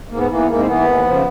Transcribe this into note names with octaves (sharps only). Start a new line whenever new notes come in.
G#2 A#3
B3
E3 A#3
B3
G#2 A#3
C4
E3 B3
D#2
C#3 F3